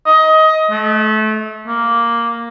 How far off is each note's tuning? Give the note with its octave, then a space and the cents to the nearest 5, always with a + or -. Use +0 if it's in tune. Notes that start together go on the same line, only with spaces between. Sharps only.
D#5 +20
A3 -25
A#3 +0